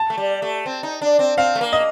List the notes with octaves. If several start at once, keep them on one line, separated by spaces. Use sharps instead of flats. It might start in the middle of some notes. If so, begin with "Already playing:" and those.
Already playing: A5
A3
G3
A3
C4
D#4
D4
C4
C4 F5
A3
A#3
D#5